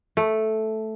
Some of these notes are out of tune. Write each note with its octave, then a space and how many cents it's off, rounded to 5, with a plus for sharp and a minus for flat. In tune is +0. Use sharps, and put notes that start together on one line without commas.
A3 -5